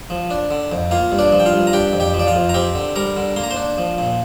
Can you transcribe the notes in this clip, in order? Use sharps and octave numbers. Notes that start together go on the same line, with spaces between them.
F3
D4
D3
F2
A#3 F4 F5
G2
D4 D5
F3
G5
F4 F5
G2
A#5
D4 G4 G5
F2
G4 G5
F3
D5
F4 F5
F2
A#5
C4 G4 G5
D3
G3 A#4 A#5
D3
A#3 C6
A#5
C5 C6
D4
F3
A#2